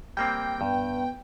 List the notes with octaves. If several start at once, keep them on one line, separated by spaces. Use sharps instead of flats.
G3 A#3 C4 G5
G2 B3